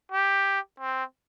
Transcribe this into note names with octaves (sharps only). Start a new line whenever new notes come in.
G4
C4